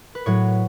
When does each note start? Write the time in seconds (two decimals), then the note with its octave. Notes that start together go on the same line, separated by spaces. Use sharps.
0.15 B4
0.26 A2 F#3 C#5